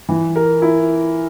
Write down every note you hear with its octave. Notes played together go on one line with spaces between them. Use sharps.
E3
A#4
E4